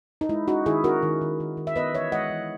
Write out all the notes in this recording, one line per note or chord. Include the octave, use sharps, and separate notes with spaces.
D#4
G#3 E4
C#4 D#4 F#4
D#3 E4 G#4
C#4 F#4 A#4
D#3
D#3
D#3
D#3
E5
B3 B4 D#5
E3 C#5 E5
G#3 D#5 F#5
E3